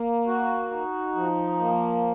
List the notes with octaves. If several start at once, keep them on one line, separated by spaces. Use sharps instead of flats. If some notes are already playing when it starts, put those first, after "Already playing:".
Already playing: A#3
F#4
D#4
F3
A#3